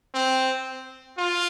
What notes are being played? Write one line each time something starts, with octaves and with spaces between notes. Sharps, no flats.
C4
F4